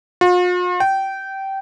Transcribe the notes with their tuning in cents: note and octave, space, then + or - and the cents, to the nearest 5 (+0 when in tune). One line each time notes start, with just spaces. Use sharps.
F4 +45
G5 -20